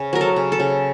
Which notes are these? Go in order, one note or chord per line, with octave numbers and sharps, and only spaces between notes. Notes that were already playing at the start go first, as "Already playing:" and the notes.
Already playing: C#3
F#3 A#4
A4
C#3
A4
C#3